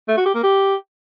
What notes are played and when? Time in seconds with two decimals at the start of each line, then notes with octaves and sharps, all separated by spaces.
0.08 A3
0.17 F#4
0.26 G4
0.35 A#3
0.43 G4